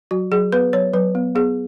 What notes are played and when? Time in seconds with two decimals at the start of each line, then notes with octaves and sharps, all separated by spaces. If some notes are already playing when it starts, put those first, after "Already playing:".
0.11 F#3 F#4
0.31 F#3 G#4
0.52 B3 B4
0.73 F#3 C#5
0.94 F#3 B4
1.15 B3
1.35 B3 G#4